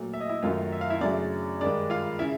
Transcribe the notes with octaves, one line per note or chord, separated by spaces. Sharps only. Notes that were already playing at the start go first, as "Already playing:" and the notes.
Already playing: A#2 F#3 A3
E5
D#5
E4 E5
F#2 D#3 F#3 A3 F4 F5
E5
F5
E4 E5
F#2 C#3 F#3 A3 D4 D5
G2 D#3 G#3 D4 D5
F4 F5
C#3 E4 E5